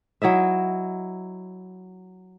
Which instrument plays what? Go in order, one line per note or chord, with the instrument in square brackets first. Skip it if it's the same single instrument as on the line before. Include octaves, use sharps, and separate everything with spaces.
[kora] F#3 E4 D#5 E5